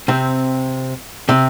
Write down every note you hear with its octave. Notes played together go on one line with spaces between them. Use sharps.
C3 C4
C3 C4